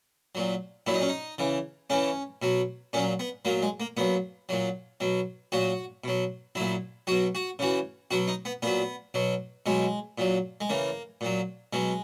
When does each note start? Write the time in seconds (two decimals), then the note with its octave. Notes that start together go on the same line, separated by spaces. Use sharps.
0.35 A#2 F#3
0.86 A#2 F#3 E4
0.94 D#4
1.01 C#4
1.08 D#4
1.38 C#3 E3
1.90 C#3 E3 C#4
2.42 B2 F#3
2.93 A#2 C#4
2.97 F#3
3.20 B3
3.45 A#2 F#3 A#3
3.62 G#3
3.80 A#3
3.97 A#2 F#3 B3
4.49 A#2 F#3
5.00 B2 F#3
5.52 A#2 F#3 F#4
6.04 B2 F#3
6.55 A#2 F#3 E4
7.07 B2 F#3 F#4
7.35 F#4
7.59 C#3 E3 F#4
8.11 B2 F#3 F#4
8.28 D#4
8.45 B3
8.63 A#2 F#3 B3
9.14 B2 F#3
9.66 B2 F#3 G#3
10.18 A#2 F#3
10.61 G#3
10.69 C#3 E3 A#3
11.21 A#2 F#3
11.73 B2 F#3 G#3